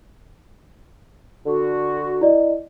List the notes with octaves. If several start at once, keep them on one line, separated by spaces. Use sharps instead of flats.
D3 F#4
E4 D5 D#5